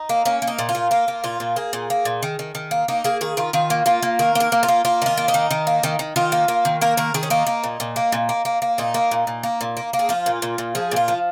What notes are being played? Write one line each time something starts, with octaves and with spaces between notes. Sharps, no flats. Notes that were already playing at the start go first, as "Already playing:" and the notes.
Already playing: D#4
A#3
A#3 C#4
A#3
D#4
A#2
F4
A#2
A#3 F4
A#3
A#2 F4
A#2
A#3 G#4
A#2
A#3
A#2
D#3
D#3
D#3
A#3
A#3 D#4
A#3 G#4
D#3 G#4
D#3 F4
D#3 F4
A#3
A#3 F4
A#3
D#3 A#4
A#3 A#4
A#3
F4
A#3
A#3 F4
D#3 F4
A#3
D#4
D#3
D#3
A#3
D#3
D#3
D#3 F4
A#3
A#3
D#3
A#3 A#4
D#3 A#4
D#3 G#4
C#4
A#3 D#4
A#3
A#2
A#2
A#3
A#2
A#3
A#3
A#3
A#2 D#4
A#3
A#2
A#2
A#3
A#2
A#3
A#3
G#4
F3 F4
A#2
A#2
A#2
F3 G#4
A#2 F4
F3